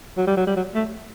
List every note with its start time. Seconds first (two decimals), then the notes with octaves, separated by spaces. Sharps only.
0.17 F#3
0.27 G3
0.37 F#3
0.46 G3
0.56 F#3
0.74 A3